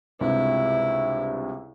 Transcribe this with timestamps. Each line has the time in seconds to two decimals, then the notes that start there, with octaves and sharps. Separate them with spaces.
0.21 C#2 G2 C3 E4